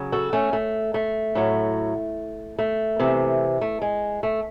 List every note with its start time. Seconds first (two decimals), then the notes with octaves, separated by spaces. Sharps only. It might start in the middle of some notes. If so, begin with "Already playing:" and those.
Already playing: C#3 F#3
0.12 F#4 A4
0.33 A3 C#4
0.53 A3
0.94 A3
1.35 A2 F#3
2.59 A3
3.00 C3 E3
3.61 A3
3.82 G#3
4.23 A3